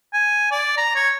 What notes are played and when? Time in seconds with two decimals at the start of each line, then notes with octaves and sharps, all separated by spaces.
0.13 G#5
0.51 D5
0.77 A#5
0.95 C#5